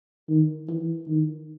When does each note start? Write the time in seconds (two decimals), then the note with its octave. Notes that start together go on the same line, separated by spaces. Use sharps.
0.29 D#3
0.69 E3
1.08 D#3